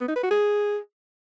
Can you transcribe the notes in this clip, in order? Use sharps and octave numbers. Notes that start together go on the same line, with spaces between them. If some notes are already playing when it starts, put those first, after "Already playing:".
B3
D#4
B4
F#4
G#4